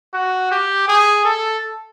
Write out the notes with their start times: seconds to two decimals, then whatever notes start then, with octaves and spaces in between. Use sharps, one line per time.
0.13 F#4
0.51 G4
0.88 G#4
1.25 A4